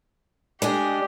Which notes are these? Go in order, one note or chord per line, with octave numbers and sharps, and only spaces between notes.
G#3 D4 G4 G#4